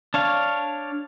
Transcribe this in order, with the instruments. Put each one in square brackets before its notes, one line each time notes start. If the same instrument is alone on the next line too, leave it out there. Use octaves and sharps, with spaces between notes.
[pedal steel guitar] D4 C#5 F5